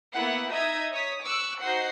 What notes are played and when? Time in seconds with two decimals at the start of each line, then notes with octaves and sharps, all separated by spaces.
0.13 A#3 B3 E4 F#5
0.50 D#4 E5 D#6 G#6
0.91 C#5 D#6 B6
1.22 C#6 D6 E6 F#6
1.59 D#4 F#4 C5 F#5 C7